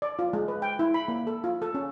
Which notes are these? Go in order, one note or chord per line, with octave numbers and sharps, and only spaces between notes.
D5
F4
G#3
B4
G5
E4
B5
A#3
A4
F4
A4
C#4